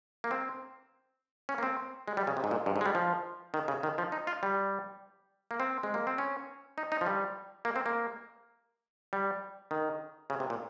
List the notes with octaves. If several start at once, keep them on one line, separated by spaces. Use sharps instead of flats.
A#3
C4
C#4
A#3
C4
G#3
G3
C#3
C3
G#2
A#2
G2
G#2
G#3
G3
F3
D#3
C#3
D#3
F3
D#4
F4
G3
A#3
C4
G#3
A#3
C4
C#4
D#4
D#4
F3
G3
A#3
C4
A#3
G3
D#3
C#3
C3
A#2